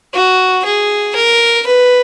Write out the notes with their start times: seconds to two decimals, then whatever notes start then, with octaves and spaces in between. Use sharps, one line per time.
0.14 F#4
0.65 G#4
1.15 A#4
1.67 B4